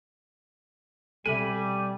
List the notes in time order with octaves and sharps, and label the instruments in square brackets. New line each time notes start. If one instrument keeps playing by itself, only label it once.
[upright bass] B2 C4 [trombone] G3 [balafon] A4 E5 [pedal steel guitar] G#5 B5